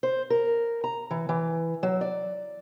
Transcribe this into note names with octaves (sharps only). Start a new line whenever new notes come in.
C5
A#4
A#5
E3
E3
F#3
D5